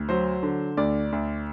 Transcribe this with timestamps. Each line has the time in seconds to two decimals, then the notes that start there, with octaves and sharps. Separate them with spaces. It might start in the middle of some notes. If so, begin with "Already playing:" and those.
Already playing: D2
0.09 F#3 C5
0.43 D3
0.77 D2 D5
1.12 D2